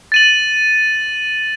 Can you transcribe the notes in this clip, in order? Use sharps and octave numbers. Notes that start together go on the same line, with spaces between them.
A6 D#7 F#7